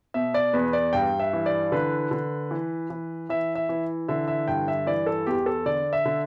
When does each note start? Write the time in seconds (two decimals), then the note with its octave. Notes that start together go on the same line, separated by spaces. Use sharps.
0.14 B2 E5
0.34 D5
0.53 E2 B4
0.73 D5
0.93 G2 G5
1.19 E5
1.33 E3
1.46 D5
1.72 D3 B4
2.11 D3
2.51 E3
2.90 E3
3.29 E3 E5
3.55 E5
3.69 E3
4.08 D3 E5
4.28 E5
4.48 G2 G5
4.68 E5
4.87 E3 D5
5.06 A4
5.26 E2 G4
5.46 A4
5.66 D3 D5
5.93 E5
6.05 D3